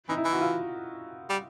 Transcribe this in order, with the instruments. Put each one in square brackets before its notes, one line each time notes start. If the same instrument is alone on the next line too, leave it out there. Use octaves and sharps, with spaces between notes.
[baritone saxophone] E3 [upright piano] D#4
[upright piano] E4
[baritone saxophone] E3
[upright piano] F#4
F4
[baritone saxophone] G3